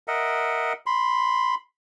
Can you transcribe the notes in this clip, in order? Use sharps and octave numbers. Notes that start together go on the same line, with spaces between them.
A#4 D#5 E5 F#5
B5 C6